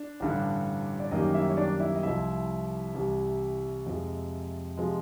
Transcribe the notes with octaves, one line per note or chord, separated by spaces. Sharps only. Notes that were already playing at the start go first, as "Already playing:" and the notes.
Already playing: D4
A1 G2 D3
D5
F#2 D#3 G3 A#3 D#4 D#5
E4 E5
C#5
D4 D5
E4 E5
D#5
C2 C3 F3 E4 E5
C2 C3 E3 G3
F2 C3 F3 G#3
C3 F3 G#3